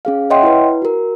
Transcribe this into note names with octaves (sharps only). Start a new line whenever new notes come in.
C#4 G#4 F5
C#5 D#5 E5 F#5 G5 C6
E4 B4
F#4 A#4